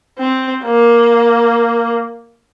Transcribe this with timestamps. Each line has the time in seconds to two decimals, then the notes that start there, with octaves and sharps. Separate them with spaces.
0.18 C4
0.64 A#3